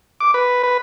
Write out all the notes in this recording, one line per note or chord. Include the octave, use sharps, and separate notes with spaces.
D6
B4
B4